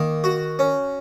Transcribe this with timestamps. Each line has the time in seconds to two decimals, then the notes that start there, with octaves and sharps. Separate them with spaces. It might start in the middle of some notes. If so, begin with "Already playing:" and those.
Already playing: D#3 A#3
0.24 F#4
0.59 C#4